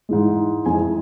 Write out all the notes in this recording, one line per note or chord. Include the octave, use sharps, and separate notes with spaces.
G#2 E3 G#3
F2 E3 G#3 G#5